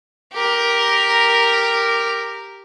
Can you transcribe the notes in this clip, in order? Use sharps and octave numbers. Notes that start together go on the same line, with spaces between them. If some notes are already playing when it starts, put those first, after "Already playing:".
G4 A#4